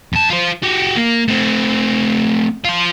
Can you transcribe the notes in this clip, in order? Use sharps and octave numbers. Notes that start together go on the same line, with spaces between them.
F2 A5
F4 C5
F#4 G4
A#3
A3 C4
F4 C5